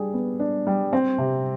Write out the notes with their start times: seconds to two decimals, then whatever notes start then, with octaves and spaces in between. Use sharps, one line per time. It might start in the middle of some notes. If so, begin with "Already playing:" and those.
Already playing: G3 D4 G#4
0.14 B3
0.40 D4
0.67 G3
0.93 C4
1.18 C3